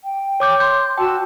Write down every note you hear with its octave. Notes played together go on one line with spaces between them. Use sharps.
G5
C#5 D6 G6
C6 G6
F#4 G5 A5 E6